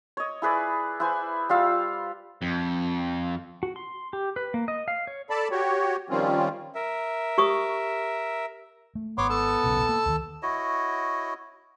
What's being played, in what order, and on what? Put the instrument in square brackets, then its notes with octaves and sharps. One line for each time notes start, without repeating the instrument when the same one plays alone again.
[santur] C#5 D#5
E4 G#4 B4 D5
E4 B4 C5 G#5
G3 F4 F5 E6
[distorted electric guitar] F2
[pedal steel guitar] F#4
C6
G4
B4
A#3
D#5
F5
C#5
[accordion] A4 D5 A5 B5
F#4 G4 C#5
D#3 F3 G3 C4 C#4 F4
[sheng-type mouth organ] A#4 E5
[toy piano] G4 C#6 D#6
[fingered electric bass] A3
[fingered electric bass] G#1 [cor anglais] B3 [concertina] C#5 C6 D6
[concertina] A4 A5 E6
[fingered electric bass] D#1 B1 C#3
A#3
D2 D#3
[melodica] E4 F#4 C#5 D#5